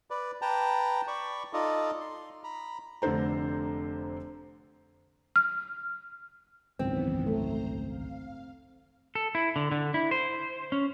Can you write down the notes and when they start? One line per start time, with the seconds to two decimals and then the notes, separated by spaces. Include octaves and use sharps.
0.10 B4 D5
0.42 B4 G5 A5 A#5
1.08 D5 B5 C#6
1.53 D#4 F4 A4 D5 D#5
2.00 C6
2.44 A#5 B5
3.02 F1 D3 A4 C5 A#5
5.36 F6
6.79 G#1 C#2 F#2 D#3 E3 B3 C4
7.26 A3 C5 A#5
7.88 F5
9.15 A4
9.35 E4
9.56 D3
9.72 D3
9.94 E4
10.11 C5
10.72 C#4